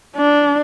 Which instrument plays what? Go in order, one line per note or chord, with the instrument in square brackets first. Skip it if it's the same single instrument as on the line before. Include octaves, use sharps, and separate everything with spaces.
[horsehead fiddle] D4